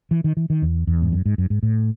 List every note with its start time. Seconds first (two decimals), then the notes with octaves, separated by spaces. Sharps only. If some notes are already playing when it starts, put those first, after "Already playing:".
0.11 E3
0.24 D#3
0.37 E3
0.50 D#3
0.62 E2
0.87 E2
1.02 G#2
1.12 F#2
1.26 G#2
1.38 F#2
1.50 G#2
1.63 A2